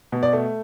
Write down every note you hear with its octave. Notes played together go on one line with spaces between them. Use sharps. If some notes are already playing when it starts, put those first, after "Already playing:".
B2
D5
A3